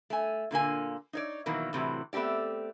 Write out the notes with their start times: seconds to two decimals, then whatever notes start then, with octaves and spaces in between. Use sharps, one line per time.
0.10 A3 G#5
0.51 A#2 D3 A#3 G#5
1.13 D#4 C#5 D5
1.46 B2 D#3 E3 F#3 A#3
1.73 A2 C3 E3 F#3
2.13 A3 B3 C4 G4 D5